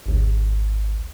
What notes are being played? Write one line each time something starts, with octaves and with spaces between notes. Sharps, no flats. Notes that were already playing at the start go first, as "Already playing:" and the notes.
G#1 D2